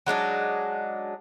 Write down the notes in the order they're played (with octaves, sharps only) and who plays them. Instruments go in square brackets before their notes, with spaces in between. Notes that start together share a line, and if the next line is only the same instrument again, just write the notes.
[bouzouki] F#3 G#3 D4 D#4